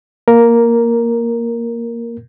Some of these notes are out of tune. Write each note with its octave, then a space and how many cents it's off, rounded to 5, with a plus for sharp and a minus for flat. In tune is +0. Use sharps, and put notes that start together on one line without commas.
A#3 +0 A#4 +0